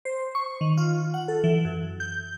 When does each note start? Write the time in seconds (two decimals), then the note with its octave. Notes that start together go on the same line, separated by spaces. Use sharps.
0.05 C5
0.35 C#6
0.61 D#3
0.77 F4
1.14 F#5
1.28 A4
1.44 E3
1.65 F#2
2.00 G6